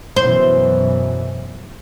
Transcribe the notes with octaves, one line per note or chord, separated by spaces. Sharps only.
F#2 B2 E3 C5